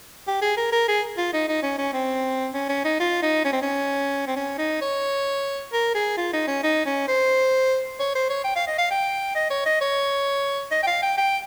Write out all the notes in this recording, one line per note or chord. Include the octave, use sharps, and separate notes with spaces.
G4
G#4
A#4
A#4
G#4
F4
D#4
D#4
C#4
C#4
C4
C#4
C#4
D#4
F4
D#4
C#4
C4
C#4
C4
C#4
D#4
C#5
A#4
G#4
F4
D#4
C#4
D#4
C#4
C5
C#5
C5
C#5
G5
F5
D#5
F5
G5
D#5
C#5
D#5
C#5
D#5
G5
F5
G5
G5